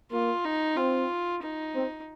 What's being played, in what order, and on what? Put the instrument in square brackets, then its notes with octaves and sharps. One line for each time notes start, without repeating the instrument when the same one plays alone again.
[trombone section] A#3 [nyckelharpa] F4
[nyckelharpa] D#4
[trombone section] C4 [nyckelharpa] F4
[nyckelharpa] D#4
[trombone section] C4